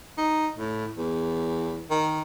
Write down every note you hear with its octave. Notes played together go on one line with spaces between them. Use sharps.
D#4
A2
E2
D#3